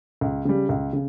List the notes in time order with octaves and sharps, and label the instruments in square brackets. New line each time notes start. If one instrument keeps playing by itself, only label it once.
[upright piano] C#2
C#3 G3
C#2
C#3